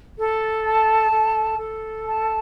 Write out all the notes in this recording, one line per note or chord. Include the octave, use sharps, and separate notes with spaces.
A4
A5
A4
A4
A5